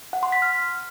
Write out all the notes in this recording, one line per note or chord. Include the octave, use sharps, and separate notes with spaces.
F#5
C6
B6
F6